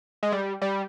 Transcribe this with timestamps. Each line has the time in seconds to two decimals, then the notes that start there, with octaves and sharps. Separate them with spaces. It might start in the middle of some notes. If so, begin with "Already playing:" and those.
0.23 G#3
0.32 G3
0.62 G3